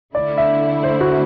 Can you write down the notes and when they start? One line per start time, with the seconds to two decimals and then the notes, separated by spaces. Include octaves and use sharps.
0.15 D3 A3 E4 D5
0.38 E5
0.83 C5
1.01 F#4